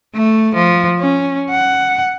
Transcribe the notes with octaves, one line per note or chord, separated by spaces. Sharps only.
A3
F3
C#4
F#5